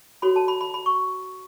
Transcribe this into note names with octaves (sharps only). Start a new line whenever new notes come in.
F#4 A4 C#5 B5
A5
B5
B5
B5
C#6